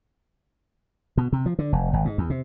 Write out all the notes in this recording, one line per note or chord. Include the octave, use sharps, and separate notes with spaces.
B2
C3
F3
D3
F1
G#1
G#2
E2
C3